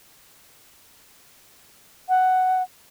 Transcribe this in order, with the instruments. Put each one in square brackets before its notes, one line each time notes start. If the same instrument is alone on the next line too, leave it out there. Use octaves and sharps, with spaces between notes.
[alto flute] F#5